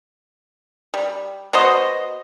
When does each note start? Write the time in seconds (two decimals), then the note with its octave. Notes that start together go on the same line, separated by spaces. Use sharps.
0.94 G3
1.53 B3 F#4 C5 D#5